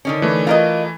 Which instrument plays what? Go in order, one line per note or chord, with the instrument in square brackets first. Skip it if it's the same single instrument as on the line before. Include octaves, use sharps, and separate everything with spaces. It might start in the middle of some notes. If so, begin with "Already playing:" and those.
[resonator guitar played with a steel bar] D3 D#3 C#4
[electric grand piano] E3 A3
[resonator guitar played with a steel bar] F4 A#4 D#5